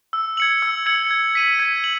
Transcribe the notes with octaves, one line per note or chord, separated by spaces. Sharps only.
E6
G#6 C#7 F#7
E6
G#6 C#7 F#7
G#6
B6 D#7 F#7
G#6
F#7